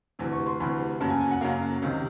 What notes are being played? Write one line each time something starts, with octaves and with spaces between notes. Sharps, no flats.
D2 C3 E3
C#6
C6
D2 C3 E3 B5
F#2 C#3 F#3 A#3 A5
G#5
G#5
F#5
F#2 C#3 F#3 A#3 F5
C#2 C3 D#3